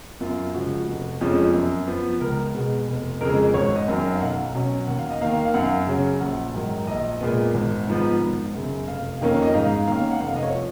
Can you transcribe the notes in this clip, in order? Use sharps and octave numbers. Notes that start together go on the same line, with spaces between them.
F#2 F4
C#3 F3 G#3 F#4
F1
F2 F3 G#3 C#4
F#2
F3 B3
C#2 A#4
B2 G#3 B3
F1
F2 C#3 G#3 A#4
G#1 C#5
D#5
F#2 D#3 F#3
F5
B1 F#5
B2 F#3 C#4
D#2 F#5
F5
D#5
D#3 A#3 F5
F5
F#2 F#5
C#3 F#3 C#4
A#1 F#5
G#2 D#3 F#3
A#1 D#5
A#2 G#3 B3
G#1
G#2 F3 B3
G#1
F#2 C#3
F1 F5
F2 D#3 A#3 C#4
D#5
G#2 F5
D#3 A#3 C#4 F5
F#5
F1 F5
D#5
C#5
F3